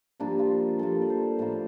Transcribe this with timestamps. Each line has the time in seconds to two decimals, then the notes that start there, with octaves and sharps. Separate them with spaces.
0.20 G2 F3 A#3 D4
0.39 F4
0.79 G2 F3 A#3 A4
1.02 D5
1.10 C5
1.39 A2 F3 A#3